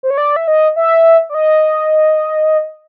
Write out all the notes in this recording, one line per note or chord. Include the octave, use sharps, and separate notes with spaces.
C5
C#5
D5
E5
D#5
E5
D5
D#5